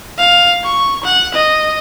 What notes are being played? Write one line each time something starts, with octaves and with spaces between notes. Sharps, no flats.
F5
C#6
F#5
D#5